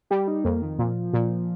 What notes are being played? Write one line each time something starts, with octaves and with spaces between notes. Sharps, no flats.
G3 G4
D#4
F2 A#3
D#3
A#2 F3
A#2